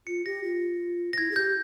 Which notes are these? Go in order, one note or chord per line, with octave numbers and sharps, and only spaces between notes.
F4 C#7
G4 A#6
F4
A#6
E4 G#6
G#4
G4 G6